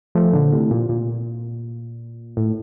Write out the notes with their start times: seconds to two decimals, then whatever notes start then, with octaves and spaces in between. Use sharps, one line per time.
0.15 F3 A3
0.33 A#2 D3
0.52 A2 C3
0.71 A#2
0.89 A#2
2.37 A2